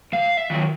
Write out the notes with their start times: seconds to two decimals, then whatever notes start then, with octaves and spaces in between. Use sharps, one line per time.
0.13 G#2 F5
0.37 E5
0.50 D#3 F#3